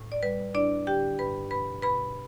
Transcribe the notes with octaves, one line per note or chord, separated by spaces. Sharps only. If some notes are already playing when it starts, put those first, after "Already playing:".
Already playing: A2
D5
G3 B4
D4 E4 D5
D3 G4 G5
G2 B4 B5
B2 B4 B5
B2 B4 B5